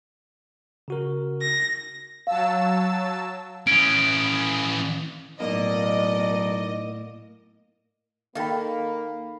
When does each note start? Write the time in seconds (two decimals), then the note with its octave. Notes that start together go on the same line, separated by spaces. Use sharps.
0.88 C#3 F#4 A#4
1.41 A#6
2.27 F#3 F5 A5 E6
3.67 E3 C#4 D#6 D7
5.40 B1 A2 A#3 D5 D#5
8.35 D#3 A#3 A4 F5 B5